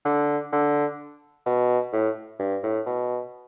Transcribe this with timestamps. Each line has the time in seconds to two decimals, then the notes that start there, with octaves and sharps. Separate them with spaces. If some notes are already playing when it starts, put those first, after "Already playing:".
0.05 D3
0.52 D3
1.46 B2
1.93 A2
2.40 G2
2.63 A2
2.86 B2